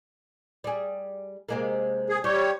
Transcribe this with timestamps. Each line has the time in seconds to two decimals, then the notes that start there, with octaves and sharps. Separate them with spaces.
0.64 G3 G#4
1.49 C3 G#3 A#3
2.09 G#4
2.24 G3 G4 C#5